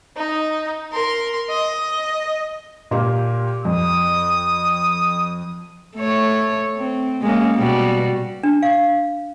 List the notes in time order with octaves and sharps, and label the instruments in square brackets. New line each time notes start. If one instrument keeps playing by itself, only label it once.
[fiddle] D#4
A#4 C6
D#5
[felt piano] A#2 A#3 G4
[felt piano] F2 [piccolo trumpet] D#6
[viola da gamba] A3 C#5
C4
G#3 A#3 C#4
B2 G3 F#4
[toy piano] D4
F5